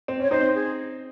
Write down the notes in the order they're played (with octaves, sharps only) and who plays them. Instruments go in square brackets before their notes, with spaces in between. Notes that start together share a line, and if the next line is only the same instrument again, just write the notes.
[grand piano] C4
[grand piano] C#4 [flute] C#5
[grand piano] C4 D#4 [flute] C5
[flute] G#4